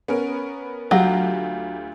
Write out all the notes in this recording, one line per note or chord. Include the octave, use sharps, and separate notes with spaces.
B3 C#4 A#4
D2 F#3 F4 G4